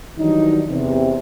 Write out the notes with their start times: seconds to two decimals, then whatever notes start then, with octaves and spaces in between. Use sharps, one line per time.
0.18 D#3 E3 F#3 G3 D4 D#4
0.70 E2 C3